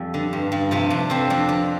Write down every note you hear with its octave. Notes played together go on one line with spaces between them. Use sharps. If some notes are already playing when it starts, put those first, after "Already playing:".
Already playing: F2 G3 G4
D3
G2
G2
C3 F3 F4
C3 D4
F2 C4
F2 D4
D3 D4